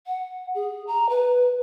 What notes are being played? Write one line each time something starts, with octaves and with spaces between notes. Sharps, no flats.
F#5
G#4
A#5
B4